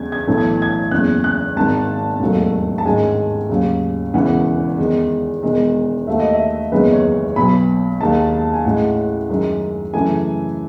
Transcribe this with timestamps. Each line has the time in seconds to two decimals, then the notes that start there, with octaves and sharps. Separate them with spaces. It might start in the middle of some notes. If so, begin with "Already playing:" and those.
Already playing: E2 C#3 G#3 G#6
0.12 G#6
0.27 B1 A2 E3 A3
0.38 G#6
0.62 G#6
0.91 F#1 E2 C#3 F#6
1.24 F#6
1.56 G#1 G#2 D#3 A5
2.20 E1 D#2 D#3 F#3 A3
2.78 A5
2.85 A1 G#2 D#3 G#3 G#5
3.49 D#2 C#3 F#3
4.14 E1 E2 C#3 E3 F#5
4.79 E2 D#3 G#3
5.43 E1 E2 D#3 G#3
6.07 D#2 D#3 A3 E5
6.20 D#5
6.33 E5
6.72 F#1 E2 D#3 G#3 B4
6.93 C#5
7.36 B1 B2 F#3 B5
8.01 D#2 D#3 G#3 A5
8.53 G#5
8.65 A1 A2 G#3 F#5
9.30 F#2 D#3 G#3
9.94 F#2 C#3 E3 A3 G#5